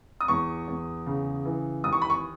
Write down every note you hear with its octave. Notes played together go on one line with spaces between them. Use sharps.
D#6
E2 C#6
E2
C#3
E3
D#2 D#6
C#6
B5
C#6